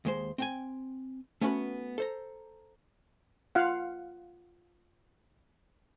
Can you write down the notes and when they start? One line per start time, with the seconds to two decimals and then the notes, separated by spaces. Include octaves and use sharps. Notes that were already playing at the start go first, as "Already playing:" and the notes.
0.05 D#2 G#3 C5
0.38 C4 G5 G#5
1.41 A3 B3 C#4 F#4 A4 B4
1.98 A4 C5 A#5
3.55 F4 F5 F#5